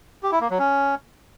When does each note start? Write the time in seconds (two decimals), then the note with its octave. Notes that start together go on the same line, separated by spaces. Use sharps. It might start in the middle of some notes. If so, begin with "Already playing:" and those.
0.23 G4
0.32 E4
0.41 A#3
0.50 F#3
0.59 C#4